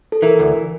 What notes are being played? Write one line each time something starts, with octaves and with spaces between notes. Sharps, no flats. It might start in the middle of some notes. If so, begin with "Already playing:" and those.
A4
E3 A#4
D2